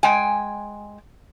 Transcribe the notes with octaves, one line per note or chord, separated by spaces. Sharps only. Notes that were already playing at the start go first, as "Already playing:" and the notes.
G#3 G5 G#5